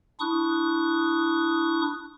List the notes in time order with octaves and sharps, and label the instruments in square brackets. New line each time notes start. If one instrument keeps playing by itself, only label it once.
[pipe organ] D4 E4 C#6 D#6 F#6